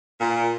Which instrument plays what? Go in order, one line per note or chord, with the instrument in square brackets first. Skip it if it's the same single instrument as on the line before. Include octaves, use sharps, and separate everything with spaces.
[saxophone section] A#2